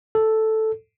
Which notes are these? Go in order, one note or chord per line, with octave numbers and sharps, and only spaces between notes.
A4